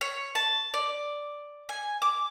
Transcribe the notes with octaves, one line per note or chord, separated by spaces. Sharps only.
C#5
A5
D5
G#5
D6